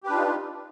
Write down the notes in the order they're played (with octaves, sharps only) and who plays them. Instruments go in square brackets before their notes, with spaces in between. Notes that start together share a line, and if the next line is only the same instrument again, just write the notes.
[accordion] G4
B4
D4
F4
D#4